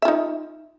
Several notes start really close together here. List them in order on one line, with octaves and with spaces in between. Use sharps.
E5 F4 D#4